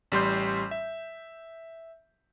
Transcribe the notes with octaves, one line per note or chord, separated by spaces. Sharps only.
A1 G3 C6 G6
E5